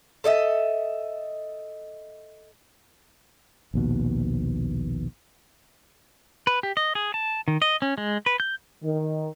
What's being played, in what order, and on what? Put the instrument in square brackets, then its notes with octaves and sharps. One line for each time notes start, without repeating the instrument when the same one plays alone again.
[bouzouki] A4 C#5 D#5 E5
[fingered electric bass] A#1 D#2 B2
[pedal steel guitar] B4
G4
D#5
G#4
A5
D#3
D#5
C#4
G#3
B4
G6
[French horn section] D#3